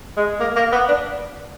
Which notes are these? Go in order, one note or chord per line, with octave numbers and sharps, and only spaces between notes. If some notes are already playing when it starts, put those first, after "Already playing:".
G#3
A#3
A#3
B3
D4